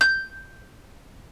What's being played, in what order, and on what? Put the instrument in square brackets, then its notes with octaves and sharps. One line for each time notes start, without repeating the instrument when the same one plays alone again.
[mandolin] G6